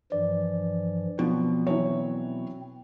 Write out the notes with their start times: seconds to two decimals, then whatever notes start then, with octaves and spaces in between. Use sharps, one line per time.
0.12 G2 E3 F3 D5
1.19 B2 F3 F#3 C4
1.67 E3 F#3 C#5